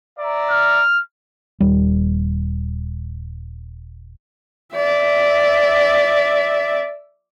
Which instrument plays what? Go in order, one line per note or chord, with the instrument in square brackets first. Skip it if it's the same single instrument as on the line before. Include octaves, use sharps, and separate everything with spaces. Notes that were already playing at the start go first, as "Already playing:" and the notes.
[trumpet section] D5 E5 A#5
[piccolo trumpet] F6
[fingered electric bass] D#1 G3
[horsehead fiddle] D5 E5